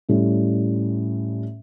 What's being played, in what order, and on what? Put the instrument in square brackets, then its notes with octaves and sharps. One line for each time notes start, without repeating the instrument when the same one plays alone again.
[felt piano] A2 G3 C#4